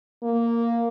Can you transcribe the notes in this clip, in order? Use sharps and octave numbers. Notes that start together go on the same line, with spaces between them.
A#3